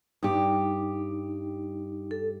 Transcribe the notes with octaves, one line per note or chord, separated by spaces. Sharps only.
G2 D#4 G4
A4